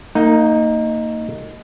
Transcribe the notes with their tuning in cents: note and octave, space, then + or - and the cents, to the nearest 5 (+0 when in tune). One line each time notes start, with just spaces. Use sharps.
A#3 -30 D#4 +0 F#5 +0